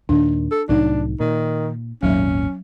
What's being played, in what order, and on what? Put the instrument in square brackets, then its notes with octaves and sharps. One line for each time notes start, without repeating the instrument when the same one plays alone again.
[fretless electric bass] D#2 A#2 D#3 [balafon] D4
[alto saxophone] A4
[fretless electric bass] C2 A2 F#3 [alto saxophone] D4 [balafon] D#4
[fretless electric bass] A#2 [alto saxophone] D#3
[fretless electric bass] G#1 D#2 A#2 [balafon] F#3 E5 [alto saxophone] C#4